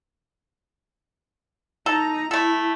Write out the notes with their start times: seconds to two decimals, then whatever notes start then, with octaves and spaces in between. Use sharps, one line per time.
1.86 D#4 A4 A#5
2.31 A3 E4 A4